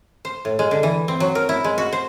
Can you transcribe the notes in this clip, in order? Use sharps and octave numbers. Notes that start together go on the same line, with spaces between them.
C5
A2
G#3
D3
E3
C4
F#3
A#4
E4
G#3
F#4
C5